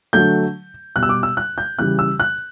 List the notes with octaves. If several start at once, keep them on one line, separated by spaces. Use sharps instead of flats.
D3 F#3 A3 G6
B2 G3 F#6
E6
D6
E6
F#6
G6
C#3 E3 G3 F#6
E6
F#6